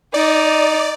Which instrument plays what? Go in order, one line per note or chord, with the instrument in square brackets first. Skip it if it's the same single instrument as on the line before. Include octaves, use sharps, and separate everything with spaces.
[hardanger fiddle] D#4 [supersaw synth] D5